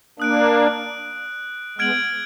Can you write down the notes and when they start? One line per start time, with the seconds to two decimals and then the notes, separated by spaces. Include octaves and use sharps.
0.19 A#3 D4 D#6 F#6 D7
1.78 G#3 B3 F6 G#6 D7 F#7